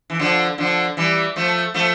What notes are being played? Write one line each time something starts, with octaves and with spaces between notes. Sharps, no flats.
E3
D3 F3
D3 F3
E3 G3
F3 A3
F3 A3